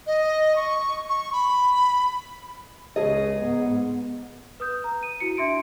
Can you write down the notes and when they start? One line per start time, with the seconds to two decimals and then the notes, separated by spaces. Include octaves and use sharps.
0.07 D#5
0.56 C#6
1.09 C#6
1.32 B5
2.96 C#2 C#3 G#4 D#5
3.42 G#2 B3
4.60 B4 D#6 G6
4.84 A#5
5.03 D#7
5.20 E4 F#4 C#7
5.37 D4 E5 C6 D7